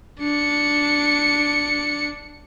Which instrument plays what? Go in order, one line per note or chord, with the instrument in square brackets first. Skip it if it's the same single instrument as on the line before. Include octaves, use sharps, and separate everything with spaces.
[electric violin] D4 C#7